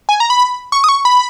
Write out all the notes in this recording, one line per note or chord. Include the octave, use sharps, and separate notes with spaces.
G#5
A#5
B5
C#6
D#6
C#6
B5